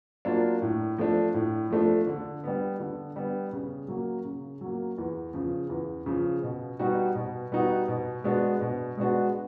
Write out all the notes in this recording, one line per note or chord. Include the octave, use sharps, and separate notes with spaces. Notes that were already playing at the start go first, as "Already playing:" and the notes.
F#3 A#3 D4 F4
A2
F3 A3 D4
A2
F3 A3 D4
D3
G3 B3
D3
G3 B3
C#3
F#3 A#3
C#3
F#3
A#3
E2
C#3 F3
E2
C#3 F3
B2
G3 B3 D#4 F#4
B2
G3 B3 D#4 F#4
B2
G#3 B3 D4 F#4
B2
G#3 B3 D4 F#4